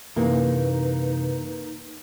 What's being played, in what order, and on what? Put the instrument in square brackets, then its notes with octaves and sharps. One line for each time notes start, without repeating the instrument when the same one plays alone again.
[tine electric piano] F#2 C3 E3 [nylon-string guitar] A#3 [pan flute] D#4 [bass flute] B4